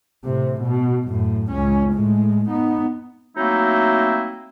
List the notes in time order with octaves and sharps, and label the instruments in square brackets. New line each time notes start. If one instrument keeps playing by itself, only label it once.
[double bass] A2 C3
B2
F#2 A2
C#2 C#4
A2 G#3
B3 D#4
[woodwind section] F#3 A3 A#3 C4 D#4 E4